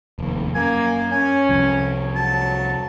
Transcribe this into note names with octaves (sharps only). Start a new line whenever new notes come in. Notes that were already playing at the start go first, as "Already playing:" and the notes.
F1 D#2
F#2 A#3 G#5
C#4 G#5
C2 F2 C#5
F#3 A5